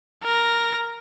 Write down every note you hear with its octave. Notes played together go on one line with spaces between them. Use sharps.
A#4 A#6